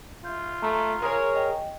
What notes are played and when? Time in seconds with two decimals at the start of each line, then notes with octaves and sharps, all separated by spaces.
0.25 F4 E5 G6
0.62 A3 A#5
1.02 G#4 A#4 C#5
1.34 D#5 G5